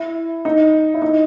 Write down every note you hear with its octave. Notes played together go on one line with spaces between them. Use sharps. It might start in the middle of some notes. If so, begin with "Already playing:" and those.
Already playing: E4
D#4
E4
D#4